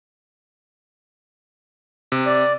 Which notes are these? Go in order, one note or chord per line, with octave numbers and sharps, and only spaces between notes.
C3
D5